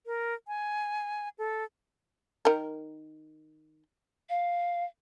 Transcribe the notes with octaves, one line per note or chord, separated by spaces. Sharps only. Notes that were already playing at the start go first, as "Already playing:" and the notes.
A#4
G#5
A4
D#3 A#4
F5